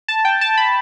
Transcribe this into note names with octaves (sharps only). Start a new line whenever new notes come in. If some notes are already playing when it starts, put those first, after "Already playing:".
A5
G5
A5
B5